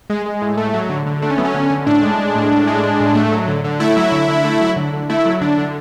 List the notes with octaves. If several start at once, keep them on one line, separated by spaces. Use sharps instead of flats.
G#3
G#3
A2
A3
F#3
D3
D3
A3 D4
C#4
F#3 B3
C#4
D3
D3
A2 D4
G#3
G#3
A2
A2
G#3
G#3
A2
A3
F#3
D3
D3
A3 E4
F#3
D3
D3
A3
F#3
D3
D3
A3 E4
F#3
D3 D4
D3